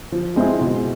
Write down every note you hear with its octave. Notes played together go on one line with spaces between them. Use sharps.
F3
G#3 C4 E4 G#4
B2